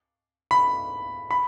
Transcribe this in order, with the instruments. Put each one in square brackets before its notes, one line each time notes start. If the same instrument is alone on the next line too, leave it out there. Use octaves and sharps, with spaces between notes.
[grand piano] B5
B5